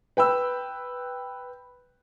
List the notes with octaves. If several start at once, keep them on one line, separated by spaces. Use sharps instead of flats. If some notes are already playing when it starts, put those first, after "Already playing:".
B4 G5 B5 E6